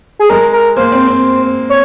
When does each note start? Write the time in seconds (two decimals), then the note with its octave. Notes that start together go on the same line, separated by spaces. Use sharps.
0.19 G#4
0.30 G#3 A#4
0.53 A#4
0.77 A#3 C5
0.92 C4
1.07 C4
1.70 C#5